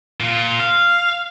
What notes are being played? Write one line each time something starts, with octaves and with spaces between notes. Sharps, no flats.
A#2 F4
F5